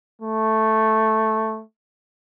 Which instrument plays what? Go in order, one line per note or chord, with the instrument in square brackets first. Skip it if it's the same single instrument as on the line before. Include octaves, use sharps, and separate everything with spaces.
[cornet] A3